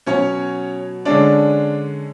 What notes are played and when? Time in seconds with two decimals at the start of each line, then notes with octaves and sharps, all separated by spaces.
0.06 B2 F#3 C#4 C#5
1.05 D3 G#3 C#4 D4 D5